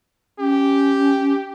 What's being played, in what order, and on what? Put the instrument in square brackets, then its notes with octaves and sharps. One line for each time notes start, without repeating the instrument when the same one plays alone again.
[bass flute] C#4 [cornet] G4